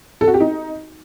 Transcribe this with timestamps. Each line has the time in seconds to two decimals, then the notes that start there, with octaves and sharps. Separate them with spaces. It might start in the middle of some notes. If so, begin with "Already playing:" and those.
0.21 A4
0.28 F#4
0.34 G4
0.40 D#4